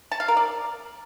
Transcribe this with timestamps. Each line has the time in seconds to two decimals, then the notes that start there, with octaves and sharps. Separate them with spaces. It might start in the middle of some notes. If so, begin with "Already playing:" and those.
0.12 A5
0.20 F5
0.28 A#4
0.37 D5